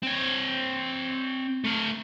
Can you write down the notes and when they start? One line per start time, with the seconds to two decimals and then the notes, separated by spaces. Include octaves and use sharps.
0.03 C4 C#5
1.64 A3 F5